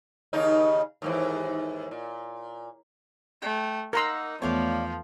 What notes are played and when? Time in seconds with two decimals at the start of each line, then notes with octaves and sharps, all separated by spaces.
0.33 D#2 C#3 D#4
1.02 D#2 G#2 E3
1.91 A#2
3.42 A3 G5
3.93 A#3 D#4 A#4 F#5 A#5 C6 E6
4.42 E2 F3 A3 B3 C#5 D5 F5